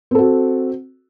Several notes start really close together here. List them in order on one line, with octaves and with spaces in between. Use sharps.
C4 A4 F#4